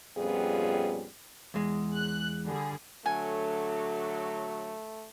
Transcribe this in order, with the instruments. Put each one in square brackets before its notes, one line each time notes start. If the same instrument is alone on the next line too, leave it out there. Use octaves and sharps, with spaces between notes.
[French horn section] F2 A#2 G3 B3 C#4 G#4
[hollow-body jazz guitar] E2 G#3
[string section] F#6
D3 G3 G#4
[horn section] D3 F#3 [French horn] A3 [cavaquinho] G#5